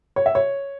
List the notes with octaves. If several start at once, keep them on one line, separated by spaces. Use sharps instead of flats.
C#5
E5
C#5